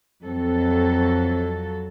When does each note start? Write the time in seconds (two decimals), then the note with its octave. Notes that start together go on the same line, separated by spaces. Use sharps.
0.24 F2 F#3 C4 A4